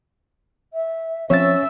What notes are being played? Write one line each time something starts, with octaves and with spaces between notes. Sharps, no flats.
E5
F3 C4 C#4 C#5 E5 E6 A6